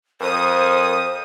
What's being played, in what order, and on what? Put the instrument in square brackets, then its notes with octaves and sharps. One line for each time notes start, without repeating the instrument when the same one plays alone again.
[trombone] F2 [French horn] A#4 [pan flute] C5 [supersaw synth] D#6